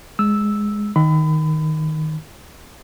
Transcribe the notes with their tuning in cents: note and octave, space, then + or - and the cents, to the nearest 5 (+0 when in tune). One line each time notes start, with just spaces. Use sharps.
G#3 +0 E6 -5
D#3 +0 B5 +30